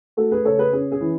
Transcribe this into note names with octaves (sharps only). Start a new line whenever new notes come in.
A3 F#4 A4
G#4 B4
C#3 A4 C#5
G#4 B4
C#4 G#4
G#4
E3